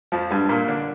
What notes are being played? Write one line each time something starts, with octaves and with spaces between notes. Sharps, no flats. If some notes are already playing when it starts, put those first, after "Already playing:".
F2 F3
G2 G3
A#2 A#3
D3 D4